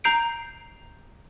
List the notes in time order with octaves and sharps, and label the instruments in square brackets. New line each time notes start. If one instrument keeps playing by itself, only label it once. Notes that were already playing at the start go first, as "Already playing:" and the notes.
[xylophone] A#5 G6 C7 D7